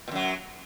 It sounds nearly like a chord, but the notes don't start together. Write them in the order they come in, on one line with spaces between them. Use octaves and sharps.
A#2 F#2 F#3